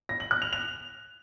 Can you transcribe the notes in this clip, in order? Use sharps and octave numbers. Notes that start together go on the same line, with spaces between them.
A#6
F#7
F#6
F7
F7